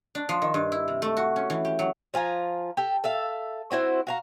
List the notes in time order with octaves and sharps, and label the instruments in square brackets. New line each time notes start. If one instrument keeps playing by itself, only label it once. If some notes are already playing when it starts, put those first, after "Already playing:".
[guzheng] D4
F3
D#3
G2
E4
C3
A3
F#4
C#4
E3
G4
F#3
[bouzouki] F3 F4 G#5 A#5
G4 A4
A4 E5 F5
C4 E4 F#4 C5
F#4 F5 A#5